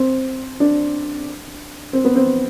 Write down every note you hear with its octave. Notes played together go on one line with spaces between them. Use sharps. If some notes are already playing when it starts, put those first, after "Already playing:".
Already playing: C4
D4
C4
B3
C4